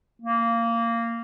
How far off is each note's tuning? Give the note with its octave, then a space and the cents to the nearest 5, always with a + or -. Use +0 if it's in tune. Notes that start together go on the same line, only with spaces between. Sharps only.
A#3 -15